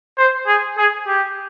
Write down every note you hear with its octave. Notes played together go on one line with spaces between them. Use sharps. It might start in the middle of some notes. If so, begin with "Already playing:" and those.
C5
G#4
G#4
G4